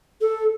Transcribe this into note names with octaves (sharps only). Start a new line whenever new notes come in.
A4